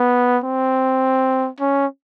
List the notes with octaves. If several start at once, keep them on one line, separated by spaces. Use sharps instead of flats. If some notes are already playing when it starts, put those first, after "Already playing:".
Already playing: B3
C4
C#4